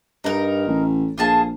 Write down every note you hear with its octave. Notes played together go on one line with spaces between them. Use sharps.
G2 D#4 A#4
A1
A#1 F4 G#4 A5